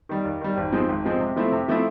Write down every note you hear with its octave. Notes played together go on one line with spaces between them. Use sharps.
D#3 G3
D#2
D#3 G3
G#1
G#2 F3 G#3 C4
G#1
G#2 F3 G#3 C4
C3
F3 A3 C4 E4
C3
F3 A3 C4 E4